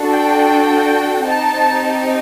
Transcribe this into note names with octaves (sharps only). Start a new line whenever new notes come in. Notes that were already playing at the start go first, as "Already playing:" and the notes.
Already playing: D4 F#4 A4
G5
C4 D#4 G4 A5